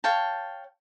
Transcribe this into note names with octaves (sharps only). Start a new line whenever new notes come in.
C#5 F5 G5 A5